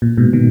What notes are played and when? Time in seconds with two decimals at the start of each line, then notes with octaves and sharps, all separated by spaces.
0.02 A#2
0.17 G#2 B2
0.33 B2 D#3